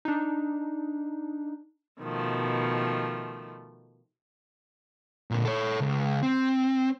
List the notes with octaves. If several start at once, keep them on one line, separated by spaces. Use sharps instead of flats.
D4 D#4
B2 D#3 F3 A3
A#2 D3
A4 C#5
C#2
C4